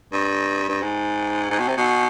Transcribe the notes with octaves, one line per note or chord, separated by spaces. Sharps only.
G2
G2
G#2
G#2
B2
C3
B2